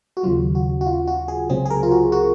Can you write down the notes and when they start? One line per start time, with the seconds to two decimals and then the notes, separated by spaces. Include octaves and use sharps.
0.17 F#4
0.23 D#2 C#3 F#3 F4
0.55 F#4
0.81 F#4
0.86 F4
1.07 F#4
1.28 G#4
1.49 C#2 C3 F#3 C4 G#4
1.65 G#4
1.70 A#4
1.83 F4
1.91 F#4
2.12 F#4